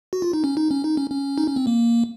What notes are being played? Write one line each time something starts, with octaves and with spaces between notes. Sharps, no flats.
F#4
F4
D#4
C#4
D#4
C#4
D#4
C#4
C#4
D#4
C#4
C4
A#3